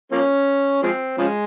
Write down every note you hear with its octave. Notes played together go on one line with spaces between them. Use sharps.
F3 A#3 C#4
F3 G#3 C4
C#3 F3 G#3